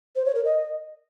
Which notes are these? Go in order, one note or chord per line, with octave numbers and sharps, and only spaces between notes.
C5
C#5
A#4
D#5